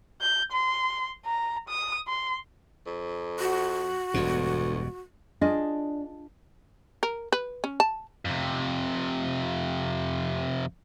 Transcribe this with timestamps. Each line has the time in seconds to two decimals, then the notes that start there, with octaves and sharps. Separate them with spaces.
0.21 G6
0.52 C6
1.26 A#5
1.69 D#6
2.08 C6
2.87 F2
3.40 F#4
4.14 E1 D2 G2 B2
5.41 D4 F4 G#4 D#5
7.03 A#4
7.32 B4
7.64 C#4
7.80 A5
8.25 F2 C3